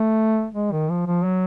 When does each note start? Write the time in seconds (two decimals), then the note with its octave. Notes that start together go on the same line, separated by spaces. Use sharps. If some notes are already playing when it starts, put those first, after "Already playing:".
Already playing: A3
0.54 G#3
0.72 D#3
0.90 F3
1.07 F3
1.24 F#3